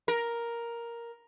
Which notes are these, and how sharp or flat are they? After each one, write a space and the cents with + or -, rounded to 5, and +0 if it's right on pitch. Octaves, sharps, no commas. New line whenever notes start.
A#4 +5